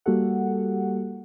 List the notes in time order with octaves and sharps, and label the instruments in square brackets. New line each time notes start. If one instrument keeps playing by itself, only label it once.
[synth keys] G3 A#3 F#4 G4 A4 F#5